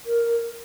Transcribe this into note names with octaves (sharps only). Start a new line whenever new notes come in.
A#4